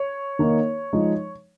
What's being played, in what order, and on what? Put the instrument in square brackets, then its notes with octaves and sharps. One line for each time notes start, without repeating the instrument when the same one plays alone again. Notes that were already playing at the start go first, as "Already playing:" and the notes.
Already playing: [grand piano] C#5
D#3 A#3 D#4
F3 G#3 D#4